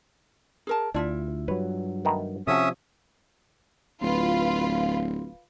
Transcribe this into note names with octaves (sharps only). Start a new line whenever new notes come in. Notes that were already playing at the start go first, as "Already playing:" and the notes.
G#4 A#4 A5
D2 D4 E4 F4 E5
G2 F#3 B4 C#5
D#3 A3 B3
C3 F3 C#4 F#4 A4 E5 D#6
D1 F4 B4